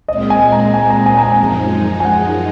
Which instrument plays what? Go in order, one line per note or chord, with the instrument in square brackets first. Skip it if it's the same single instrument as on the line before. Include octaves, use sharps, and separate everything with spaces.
[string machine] A#2 G#3 C4 [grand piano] D#5
[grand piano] G#5
A#5
G#5
A#5
G#5
A#5
G#5
[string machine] F#2 F3 G#3 D#4
[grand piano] G#5
F#5